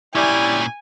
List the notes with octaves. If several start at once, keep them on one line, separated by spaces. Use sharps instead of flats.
A#2 G3 C#4 E4 G#5